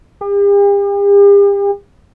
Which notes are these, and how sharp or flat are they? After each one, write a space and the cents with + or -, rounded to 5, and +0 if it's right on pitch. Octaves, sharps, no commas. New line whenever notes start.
G4 +45